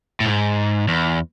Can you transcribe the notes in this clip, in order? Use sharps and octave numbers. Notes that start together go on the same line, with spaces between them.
A2
G#2
E2